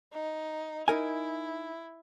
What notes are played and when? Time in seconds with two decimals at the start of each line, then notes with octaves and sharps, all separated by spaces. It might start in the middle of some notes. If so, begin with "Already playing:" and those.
0.13 D#4
0.88 D#4 E4 A#4 G#5